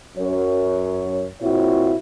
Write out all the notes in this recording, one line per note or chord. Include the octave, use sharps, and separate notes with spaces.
F#2 C#5
A#2 C4 E4 F#4 C#5